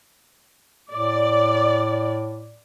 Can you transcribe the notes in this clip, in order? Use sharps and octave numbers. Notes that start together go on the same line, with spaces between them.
A2 D5